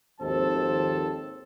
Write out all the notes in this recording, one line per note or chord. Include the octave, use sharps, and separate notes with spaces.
G#1 D#2 F3 C4 A4 A5